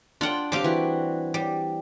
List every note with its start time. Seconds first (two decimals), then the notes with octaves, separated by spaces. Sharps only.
0.21 D4 F4 F#5 G5
0.52 G3 C4 G4 F5 D6
0.64 E3 F#4
1.34 G3